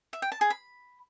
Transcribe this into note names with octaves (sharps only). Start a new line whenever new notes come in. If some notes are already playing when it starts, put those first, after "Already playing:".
E5
G5
A5
G#4
B5